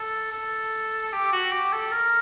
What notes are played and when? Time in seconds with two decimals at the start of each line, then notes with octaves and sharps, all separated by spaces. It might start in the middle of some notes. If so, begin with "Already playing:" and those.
Already playing: A4
0.32 A4
1.13 G4
1.32 F#4
1.52 G4
1.73 A4
1.92 A#4